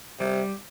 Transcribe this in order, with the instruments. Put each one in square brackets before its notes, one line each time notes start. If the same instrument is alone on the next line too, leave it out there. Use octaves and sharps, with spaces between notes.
[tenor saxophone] C3 [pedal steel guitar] G3